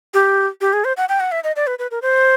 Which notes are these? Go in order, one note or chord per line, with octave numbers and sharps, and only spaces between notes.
G4
G4
G#4
C5
F#5
G5
F#5
E5
D#5
D5
B4
B4
A#4
C5